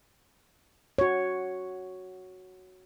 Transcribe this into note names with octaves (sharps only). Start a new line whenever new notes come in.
F#4 C#5